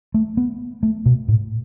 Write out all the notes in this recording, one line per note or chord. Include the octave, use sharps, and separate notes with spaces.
A3
B3
A3
B2
A2